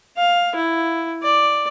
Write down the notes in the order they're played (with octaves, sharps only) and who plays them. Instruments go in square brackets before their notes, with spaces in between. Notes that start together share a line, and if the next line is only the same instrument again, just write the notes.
[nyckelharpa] F5
E4
D5